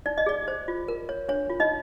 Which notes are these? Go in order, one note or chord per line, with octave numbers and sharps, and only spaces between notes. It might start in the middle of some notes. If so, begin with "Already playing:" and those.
D#4 D5
D#5
G#4 D5
C5
F4
A#4
C#5
D4 C#5
F4
D#4 D#5